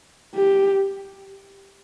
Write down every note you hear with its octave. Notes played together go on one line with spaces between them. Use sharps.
G4